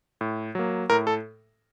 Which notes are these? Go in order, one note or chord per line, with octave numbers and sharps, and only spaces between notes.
A2
F#3 A#3
A2 A#4
A4